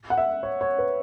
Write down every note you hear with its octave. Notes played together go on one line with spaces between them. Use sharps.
F#5
E5
C#5
C#5
B4